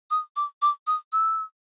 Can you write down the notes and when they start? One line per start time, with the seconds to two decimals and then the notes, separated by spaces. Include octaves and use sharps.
0.11 D#6
0.36 D6
0.62 D6
0.87 D#6
1.12 E6